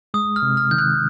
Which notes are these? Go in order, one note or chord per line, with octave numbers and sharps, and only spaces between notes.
G#3 D#6
F6
C3
F6
D#3 G6
F#6